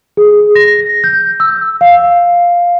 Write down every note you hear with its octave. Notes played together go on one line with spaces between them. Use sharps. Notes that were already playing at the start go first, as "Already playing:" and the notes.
G#4
A#6
G6
E6
F5